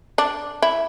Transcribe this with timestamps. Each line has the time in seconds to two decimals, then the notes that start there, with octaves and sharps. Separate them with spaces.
0.18 D4
0.62 E4